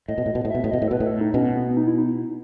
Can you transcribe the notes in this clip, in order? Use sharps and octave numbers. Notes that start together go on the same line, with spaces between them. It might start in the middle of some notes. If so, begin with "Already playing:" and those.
A2 D#5
B2
A2
B2
A2
B2 E5
A2
B2 D#5
A2
A4
B2 B4
A2
A4
D#4
B2 C#4
B3
B3
B3
D#4
E4
D#4